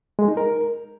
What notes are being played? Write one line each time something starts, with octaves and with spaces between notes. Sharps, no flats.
G#3
D#4
A#4